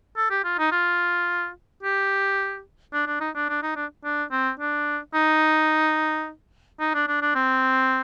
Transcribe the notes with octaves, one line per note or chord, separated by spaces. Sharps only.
A4
G4
F4
D#4
F4
G4
D4
D4
D#4
D4
D4
D#4
D4
D4
C4
D4
D#4
D#4
D4
D4
D4
C4